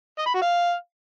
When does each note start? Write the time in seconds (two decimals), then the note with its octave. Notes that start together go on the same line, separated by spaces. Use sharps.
0.18 D#5
0.26 B5
0.34 F#4
0.42 F5